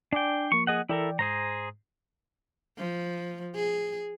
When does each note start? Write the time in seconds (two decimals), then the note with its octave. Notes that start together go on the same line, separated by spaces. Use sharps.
0.13 D4 D5 G5 G#5 D6
0.52 F3 A#3 C#6
0.67 G#4 D#5 F#5
0.89 E3 E4 A4 A#4 D5 G5
1.19 G#2 G#4 C5 A#5
2.78 F3
3.55 G#4